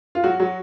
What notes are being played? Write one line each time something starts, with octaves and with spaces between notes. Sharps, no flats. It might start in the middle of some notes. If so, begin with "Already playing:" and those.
F4
F#3 F#4
F#3 F#4